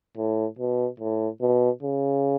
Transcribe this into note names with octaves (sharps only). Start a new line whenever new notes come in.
A2
B2
A2
B2
C#3